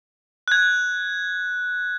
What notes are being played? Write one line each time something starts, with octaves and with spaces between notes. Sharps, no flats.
F#6 G#6